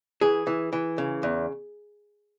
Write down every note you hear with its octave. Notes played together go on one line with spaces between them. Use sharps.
E3 G#4
E3
E3
C#3
E2